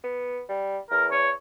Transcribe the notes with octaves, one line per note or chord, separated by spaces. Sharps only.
B3
G3
E2 A#4
C#5